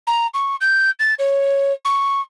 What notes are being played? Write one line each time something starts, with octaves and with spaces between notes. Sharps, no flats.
A#5
C#6
G6
A6
C#5
C#6